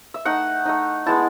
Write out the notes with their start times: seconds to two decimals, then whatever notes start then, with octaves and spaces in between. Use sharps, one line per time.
0.14 E5
0.25 A3 D#4 F#5
0.66 A3 D#4
1.06 G#3 B3 E4 A5